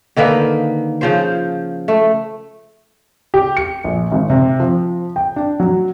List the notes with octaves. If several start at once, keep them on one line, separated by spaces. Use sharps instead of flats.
D3 D#3 A#3 B4
C#3 F3 C5
A3
G4
C#7
A#1
G#1
C3
F3
G5
D4
F#3